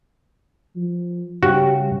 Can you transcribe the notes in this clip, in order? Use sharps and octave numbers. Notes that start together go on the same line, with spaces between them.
F3
C#3 G3 F#4 G4